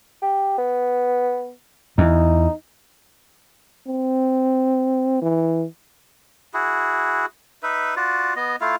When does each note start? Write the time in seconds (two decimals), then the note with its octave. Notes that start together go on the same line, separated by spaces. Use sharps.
0.22 G4
0.58 B3
1.98 E2 D#4
3.87 C4
5.22 E3
6.54 E4 F#4 G#4
7.63 D#4 B4 E5
7.96 F4 F#4 D5
8.36 B3 D#5
8.61 A3 E4 F4 F5